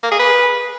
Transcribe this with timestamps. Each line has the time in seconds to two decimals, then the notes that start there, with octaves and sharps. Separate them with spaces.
0.03 A#3
0.11 G#4
0.19 B4